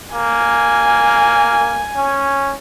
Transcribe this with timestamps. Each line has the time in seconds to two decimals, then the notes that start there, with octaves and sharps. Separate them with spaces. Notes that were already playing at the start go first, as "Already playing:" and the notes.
0.15 A#3 G#5
1.97 C#4